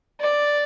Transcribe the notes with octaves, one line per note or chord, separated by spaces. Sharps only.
D5